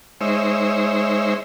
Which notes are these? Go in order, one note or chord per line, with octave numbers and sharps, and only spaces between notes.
G#3 D#4 C5 C#5 E5